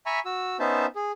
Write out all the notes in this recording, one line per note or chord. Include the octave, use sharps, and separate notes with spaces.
E5 G#5 A#5 B5 C#6
F#4 E6
B3 C#4 D#4 C5 E5 A5
G#4